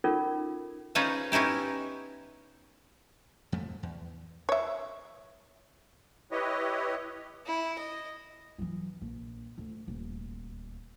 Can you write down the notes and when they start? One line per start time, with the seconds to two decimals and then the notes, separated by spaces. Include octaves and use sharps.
0.04 C#4 D#4 F4 A4 A#4
0.95 C#4 D#4 F4 G#4 B4 C5
1.32 B3 C#4 D#4 E4 G4
3.52 F2 F3 A3
3.83 E2
4.49 C#5 E5
6.31 E4 G4 B4 C#5 D#5
7.47 E4
7.78 D#5
8.58 E3 F#3
9.01 A#1
9.58 D2
9.87 D#1 D2